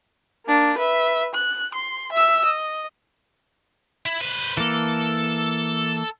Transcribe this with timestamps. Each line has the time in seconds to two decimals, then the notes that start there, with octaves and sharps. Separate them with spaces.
0.46 A#3 D4
0.78 B4 E5
1.35 F#6
1.74 C6
2.12 E5 E6
2.45 D#5
4.06 E4
4.21 B4 C5
4.57 E3 A#3 A4